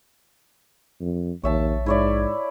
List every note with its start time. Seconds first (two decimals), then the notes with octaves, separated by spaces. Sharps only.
1.01 F2
1.43 A#1 D#2 C#5 E5 A5
1.86 G#2 E4 C#5 D5